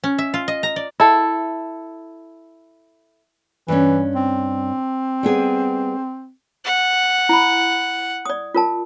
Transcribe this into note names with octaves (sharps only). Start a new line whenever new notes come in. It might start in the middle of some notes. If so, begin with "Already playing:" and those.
C#4
E5
F4
D#5
A#5
D5
E4 A4
G2 E3 C#4
C4
G3 B3 G#4
F#5
E4 B5
D5 D#6
F4 A#4 A5